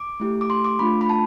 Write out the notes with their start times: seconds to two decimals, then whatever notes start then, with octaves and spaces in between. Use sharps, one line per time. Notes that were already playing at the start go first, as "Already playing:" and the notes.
Already playing: D6
0.20 A3 E4 G4
0.41 D6
0.50 C6
0.65 D6
0.79 A3 D4 F4 B5
1.01 B5
1.09 A5